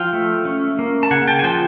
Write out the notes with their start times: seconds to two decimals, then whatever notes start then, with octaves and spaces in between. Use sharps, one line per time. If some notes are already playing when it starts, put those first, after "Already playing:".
Already playing: F3 F5 G5
0.13 A3
0.45 C#4
0.79 A#3
1.03 A5
1.11 C#3 F#5 G#5
1.28 G5 A5
1.39 G#5
1.43 F3 G5 A5